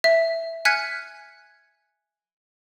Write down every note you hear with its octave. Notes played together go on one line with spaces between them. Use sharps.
E5
G#5 F6 F#6 G#6 B6 C#7